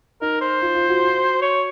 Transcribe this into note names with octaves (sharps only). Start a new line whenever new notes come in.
D#4 A#4
C5
F4
F4
F#4
C#5